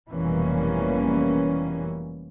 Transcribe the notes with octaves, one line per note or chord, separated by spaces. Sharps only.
F1 B2 E3 G3 A#3 C#4